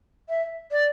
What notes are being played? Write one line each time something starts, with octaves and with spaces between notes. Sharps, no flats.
E5
D5